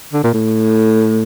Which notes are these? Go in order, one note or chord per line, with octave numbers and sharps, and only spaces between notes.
D3
A#2
A2